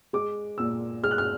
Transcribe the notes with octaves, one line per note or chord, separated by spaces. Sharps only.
G#3 D6
A#2 E6
G#3 F6
F#6
F6